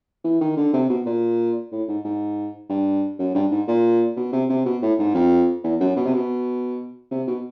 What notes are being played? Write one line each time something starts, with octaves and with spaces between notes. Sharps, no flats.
E3
D#3
D3
C3
B2
A#2
A2
G#2
G#2
G2
F#2
G2
G#2
A#2
B2
C3
C3
B2
A2
G#2
F2
E2
F#2
B2
C3
B2
C3
B2